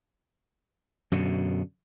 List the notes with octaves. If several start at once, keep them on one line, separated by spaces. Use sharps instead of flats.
F#2 B2 D3